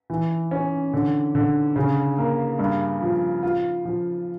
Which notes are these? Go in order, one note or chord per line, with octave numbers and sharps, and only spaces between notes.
E3
C#4
D3
D3
C#3
A#3
G2
F3
F4
F3